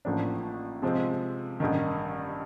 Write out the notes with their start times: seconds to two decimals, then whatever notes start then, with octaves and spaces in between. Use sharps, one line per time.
0.05 A1 A2 F3 A#3 D4
0.82 C3 F3 G#3 C4
1.60 A1 G2 D#3